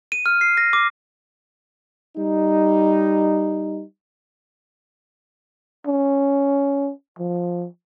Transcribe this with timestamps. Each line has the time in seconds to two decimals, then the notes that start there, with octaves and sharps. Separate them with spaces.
0.12 D#7
0.26 F6
0.41 C7
0.57 A#6
0.73 D6
2.17 G3 D#4
5.87 C#4
7.19 F3